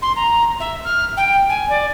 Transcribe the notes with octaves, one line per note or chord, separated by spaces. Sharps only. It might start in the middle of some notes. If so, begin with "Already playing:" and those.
C6
A#5
E5
F6
G5
G#5
D5